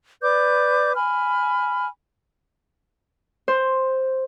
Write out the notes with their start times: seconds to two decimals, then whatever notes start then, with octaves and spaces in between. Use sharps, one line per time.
0.22 B4 D5 D6 G6
0.95 G#5 B5 F6
3.48 C5